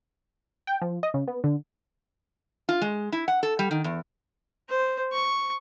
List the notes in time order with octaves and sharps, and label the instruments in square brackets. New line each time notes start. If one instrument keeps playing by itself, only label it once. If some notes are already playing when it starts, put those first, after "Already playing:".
[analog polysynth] G5
F3
D#5
C#3
B3
D3
[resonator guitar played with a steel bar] F4
G#3
E4
F#5
A4
G3
D#3
E2
[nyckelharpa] C5
C#6